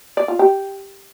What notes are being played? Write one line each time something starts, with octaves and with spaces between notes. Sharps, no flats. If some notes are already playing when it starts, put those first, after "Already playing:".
D5
F4
G4